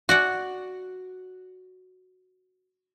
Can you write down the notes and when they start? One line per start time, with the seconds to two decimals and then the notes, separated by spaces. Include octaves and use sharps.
0.09 F#4 D5 F#5